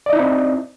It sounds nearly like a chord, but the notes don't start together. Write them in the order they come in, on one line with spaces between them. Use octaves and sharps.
D5 D#5 D#4 E4 C4